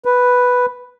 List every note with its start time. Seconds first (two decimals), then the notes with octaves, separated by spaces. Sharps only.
0.05 B4